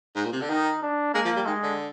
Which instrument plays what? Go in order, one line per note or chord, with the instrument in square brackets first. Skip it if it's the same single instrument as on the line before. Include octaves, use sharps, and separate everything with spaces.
[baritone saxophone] G#2
A#2
C3
D3
[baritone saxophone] D#3 [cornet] D#4
[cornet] D4
[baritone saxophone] G#3 [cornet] A#3
[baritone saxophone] F3
G3
[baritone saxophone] D#3 [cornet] G#3
[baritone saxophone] D3